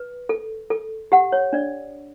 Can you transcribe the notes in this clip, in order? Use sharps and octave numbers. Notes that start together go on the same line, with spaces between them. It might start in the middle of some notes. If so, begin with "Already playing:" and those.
Already playing: B4
A4
A4
G4 F#5
C#5
D4 D5